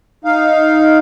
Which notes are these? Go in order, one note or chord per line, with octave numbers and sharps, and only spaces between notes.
D#4 F5